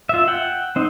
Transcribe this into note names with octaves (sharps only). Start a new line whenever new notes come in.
F4 E5
F#5 G5
C4 D#4